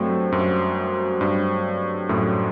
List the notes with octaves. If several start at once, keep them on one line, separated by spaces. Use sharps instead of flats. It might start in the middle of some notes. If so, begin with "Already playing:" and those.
Already playing: G2 F#3 A3 C4 F#4 C5
F#2
G2
F#2 A2